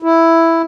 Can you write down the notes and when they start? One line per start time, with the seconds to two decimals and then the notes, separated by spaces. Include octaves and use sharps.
0.02 E4